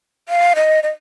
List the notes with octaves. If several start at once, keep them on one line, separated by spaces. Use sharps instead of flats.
F5
D#5
D#5